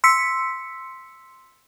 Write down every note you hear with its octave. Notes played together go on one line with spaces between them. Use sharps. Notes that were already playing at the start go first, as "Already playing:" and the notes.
C6 E6 B6 C#7